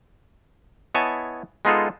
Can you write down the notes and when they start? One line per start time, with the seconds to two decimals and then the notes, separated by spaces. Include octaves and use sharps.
0.95 B3 E4 C#5 D#5 G#5 A5
1.65 G#3 B3 D#4 F4 G#4 A4